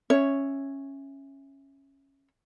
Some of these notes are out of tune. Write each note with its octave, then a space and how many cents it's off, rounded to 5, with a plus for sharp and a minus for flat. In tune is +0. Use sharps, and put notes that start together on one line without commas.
C#4 -15 C#5 +0 E5 +0